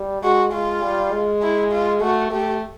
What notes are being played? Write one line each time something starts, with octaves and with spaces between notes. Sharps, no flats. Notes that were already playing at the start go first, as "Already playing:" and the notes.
Already playing: G3
G#3 F#4
G#3 F4
G3
G#3
E4
F4
A3 F#4
A3 G4